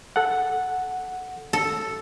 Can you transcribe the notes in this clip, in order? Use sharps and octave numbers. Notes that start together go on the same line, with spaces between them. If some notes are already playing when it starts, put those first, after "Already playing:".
A4 F#5
A4